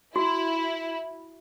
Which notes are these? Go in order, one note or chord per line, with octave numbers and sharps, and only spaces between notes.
E4 F#4